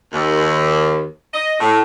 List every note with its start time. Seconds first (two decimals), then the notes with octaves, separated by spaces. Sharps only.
0.12 D#2
1.34 D#5
1.60 A2